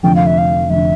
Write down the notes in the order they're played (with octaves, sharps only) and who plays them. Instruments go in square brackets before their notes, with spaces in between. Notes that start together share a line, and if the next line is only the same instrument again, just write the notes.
[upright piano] F1 F2 D3 [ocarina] G5
[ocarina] F5
E5
F5
[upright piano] F1 D3 [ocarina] E5